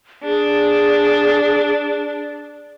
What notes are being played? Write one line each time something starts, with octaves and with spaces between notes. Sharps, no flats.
D4 G#4